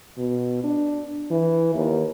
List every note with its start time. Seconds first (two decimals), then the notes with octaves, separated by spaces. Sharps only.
0.18 B2
0.64 D4
1.31 E3
1.74 D#2